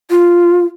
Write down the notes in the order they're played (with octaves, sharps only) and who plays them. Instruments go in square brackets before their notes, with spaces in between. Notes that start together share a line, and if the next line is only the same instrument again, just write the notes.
[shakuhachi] F4